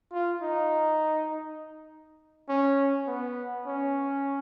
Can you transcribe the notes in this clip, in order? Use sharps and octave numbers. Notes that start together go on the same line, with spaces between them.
F4
D#4
C#4
B3
C#4